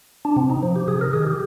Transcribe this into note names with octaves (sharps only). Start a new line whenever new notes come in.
D4
C3 C4
D#4
F3
G4
C3 G#4
A#4
D#3 G#4
G4